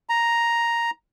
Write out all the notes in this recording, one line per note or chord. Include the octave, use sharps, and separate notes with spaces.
A#5